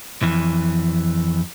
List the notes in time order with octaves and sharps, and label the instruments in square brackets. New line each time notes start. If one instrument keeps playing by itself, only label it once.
[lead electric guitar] F2 E3